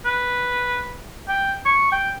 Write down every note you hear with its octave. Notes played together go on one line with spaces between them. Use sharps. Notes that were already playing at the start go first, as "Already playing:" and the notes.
B4
G5
C#6
G5